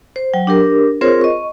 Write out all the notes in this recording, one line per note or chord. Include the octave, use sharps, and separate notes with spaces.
C5
F#3 G5
D4 G4 A#4
C4 F4 G#4 A#4 C5 C#5
D#5 C#6